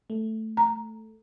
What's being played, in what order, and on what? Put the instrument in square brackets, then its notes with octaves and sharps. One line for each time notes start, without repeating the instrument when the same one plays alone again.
[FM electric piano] A3
[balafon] A#5